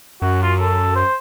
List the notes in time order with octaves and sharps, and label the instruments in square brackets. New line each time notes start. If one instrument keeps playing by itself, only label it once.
[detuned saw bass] F#2 [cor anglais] F#4
[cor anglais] F4
A4
C5